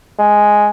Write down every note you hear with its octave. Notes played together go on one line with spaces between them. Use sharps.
G#3